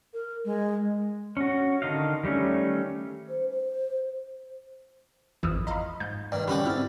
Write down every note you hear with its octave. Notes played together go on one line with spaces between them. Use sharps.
A#4
G#3
C#4 F#4
D3 D#3 D#5 F5
D#3 G3 A3 C#4
C5
C5
G#1 F2 E3 F3 D#6 E6
D#5 F5 A#5 B5
G#2 G6
G2 D#3 D5
D3 G3 C#4 F#4 G4 B5 F#6
G#2 C4 E4 F6 A6